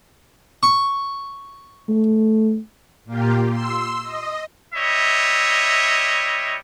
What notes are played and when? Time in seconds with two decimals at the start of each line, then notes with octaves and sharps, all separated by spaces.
0.63 C#6
1.89 A3
3.05 A#2 A#3 F4 G4
3.48 C6 E6
4.02 D#5
4.74 G3 E4 C#5 D#5 E5